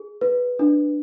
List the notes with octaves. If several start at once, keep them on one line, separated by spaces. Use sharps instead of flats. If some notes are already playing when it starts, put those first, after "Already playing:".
Already playing: G#4
B4
D4